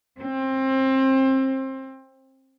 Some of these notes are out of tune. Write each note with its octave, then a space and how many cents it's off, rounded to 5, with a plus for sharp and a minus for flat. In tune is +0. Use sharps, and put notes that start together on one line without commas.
C4 +25